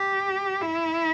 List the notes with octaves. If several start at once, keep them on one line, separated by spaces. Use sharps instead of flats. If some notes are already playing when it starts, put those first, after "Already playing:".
Already playing: G4
E4